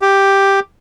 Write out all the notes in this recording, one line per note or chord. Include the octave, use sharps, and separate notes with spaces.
G4